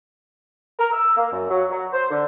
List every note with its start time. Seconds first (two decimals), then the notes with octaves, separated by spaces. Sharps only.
0.79 A#4
0.92 E6
1.17 A#3
1.32 F#2
1.49 F#3
1.70 F#3
1.93 C5
2.11 D3